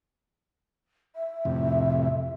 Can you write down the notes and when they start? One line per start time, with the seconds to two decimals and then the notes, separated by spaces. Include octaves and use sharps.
1.16 E5
1.45 F2 A2 C3